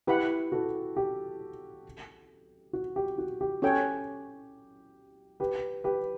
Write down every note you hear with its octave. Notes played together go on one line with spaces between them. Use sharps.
E4 G4 B4 F#5 B5
F#4 A4
G4
F#4
G4
F#4
G4
C#4 F#4 A4 C#5 G5
G4 B4
G4 B4